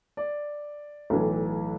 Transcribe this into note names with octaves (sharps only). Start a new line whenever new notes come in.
D5
B1 A2 E3